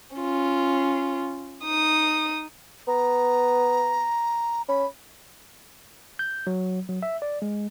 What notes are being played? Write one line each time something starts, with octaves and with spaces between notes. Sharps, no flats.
C#4 F4
D#4 D#6
B3 A#5
C#4 B5
G6
F#3
F#3
E5
D5
G#3